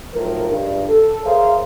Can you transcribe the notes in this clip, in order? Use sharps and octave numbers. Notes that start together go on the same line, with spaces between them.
B1 A2 F3 A#4
C#2 G2
A4
G#4 A#4 C5 C#5 E5 F5